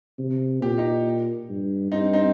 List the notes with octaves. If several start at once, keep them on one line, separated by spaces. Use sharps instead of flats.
C3
A#2 G4
D#4 G4
G2
G2 C4 D#4
C4 D#4